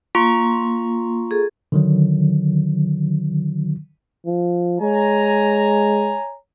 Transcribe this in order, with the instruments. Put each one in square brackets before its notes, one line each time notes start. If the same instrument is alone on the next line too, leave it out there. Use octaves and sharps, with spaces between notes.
[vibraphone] A#3 [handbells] F4 A#5 C#6
[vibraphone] G#4 A4
[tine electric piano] D3 D#3 F#3
[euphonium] F3
[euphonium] G#3 [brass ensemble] C#5 G#5 A#5